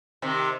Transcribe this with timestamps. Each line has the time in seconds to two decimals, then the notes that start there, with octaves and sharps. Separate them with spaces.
0.22 C3 D#3